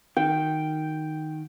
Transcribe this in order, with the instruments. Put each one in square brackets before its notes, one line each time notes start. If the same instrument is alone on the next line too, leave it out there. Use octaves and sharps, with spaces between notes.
[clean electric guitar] D#3 [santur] G5